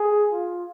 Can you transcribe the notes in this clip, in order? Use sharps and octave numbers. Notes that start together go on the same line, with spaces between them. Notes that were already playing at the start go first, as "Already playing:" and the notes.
Already playing: G#4
F4